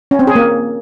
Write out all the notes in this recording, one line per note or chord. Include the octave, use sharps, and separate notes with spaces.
C#4
C4
G#4
A#3